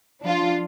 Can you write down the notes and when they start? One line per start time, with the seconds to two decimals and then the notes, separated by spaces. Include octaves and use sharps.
0.22 F3 D4 F4